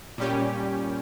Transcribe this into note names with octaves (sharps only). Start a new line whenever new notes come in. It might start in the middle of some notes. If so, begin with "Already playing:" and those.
A#2 G3 C#4 G4